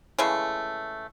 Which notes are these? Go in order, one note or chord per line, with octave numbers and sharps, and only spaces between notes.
C#3 E3 G#3 A3